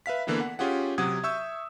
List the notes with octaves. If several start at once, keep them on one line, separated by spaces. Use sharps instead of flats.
B4 E5 F5 B6
D3 E3 A#3 B3 E4
F#5
C#4 F4 G4 G#4 F#5
C3 F#3 F#5 D#6 G#6
E5 C#6 E6 G6